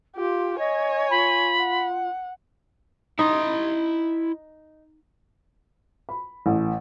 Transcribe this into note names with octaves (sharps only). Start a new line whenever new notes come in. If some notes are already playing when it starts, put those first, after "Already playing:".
F4 G4
C#5 D#5 G#5
F4 B5
F#5
D#4 E4 C6
B5
A1